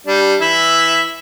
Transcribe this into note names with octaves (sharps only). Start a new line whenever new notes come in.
G3 D4
E3 E4 E5